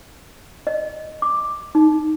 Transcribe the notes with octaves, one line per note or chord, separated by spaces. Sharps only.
D#5
D6
D#4